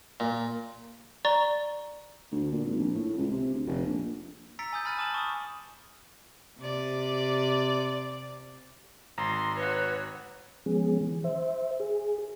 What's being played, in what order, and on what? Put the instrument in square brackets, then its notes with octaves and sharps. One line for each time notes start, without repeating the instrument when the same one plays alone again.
[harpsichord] A#2
[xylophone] D5 A#5 C#6 A6 G7
[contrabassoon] D2
A#2
G#1
A#1
A2
C#2
C3
D2
F1
A#1
[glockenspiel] A#5 E6 A6 B6 C#7 D7
G#5 D#6 G6
G#5 B5 F6 A6 D#7
A5 D6 A6 E7 F#7
C#6 D#6
[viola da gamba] C3 D5
[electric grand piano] G#1 A#5 [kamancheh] C6
[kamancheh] F#4 C#5 [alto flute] B4
[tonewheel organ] F3 G#3 B3 C#4 G#4
E3
C5 E5
G#4